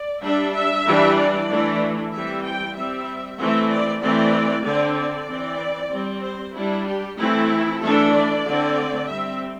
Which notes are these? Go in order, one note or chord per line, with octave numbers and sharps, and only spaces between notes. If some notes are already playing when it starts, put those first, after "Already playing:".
Already playing: D5
G3 D4 E5
E5
E3 G3 D4
D5
E3 A3 D4
E3 G3 C4 E5
G5
G3 C4 E5
E3 A3 C4 E5
D5
E3 A3 C4 D5
D3 C4 D5
D5
E3 C4
G3 C4
C5
G3 D4 E4
G4
E3 A3 C4 E4
E3 A3 D4 A4
D5
D3 A3 C4
G3 C4 E5